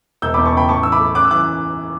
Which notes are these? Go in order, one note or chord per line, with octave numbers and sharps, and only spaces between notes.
E1 E6 G6
E2 B5 D6
A5 C#6
C#3 G5 B5
A2 A5 C#6
E3 E6
B5 D6
A3
F#2 D6 F#6
E6
E3 D6 F#6